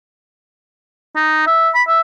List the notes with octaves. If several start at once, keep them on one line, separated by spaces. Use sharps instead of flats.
D#4
E5
B5
E5